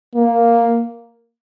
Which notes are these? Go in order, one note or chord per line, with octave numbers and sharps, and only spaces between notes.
A#3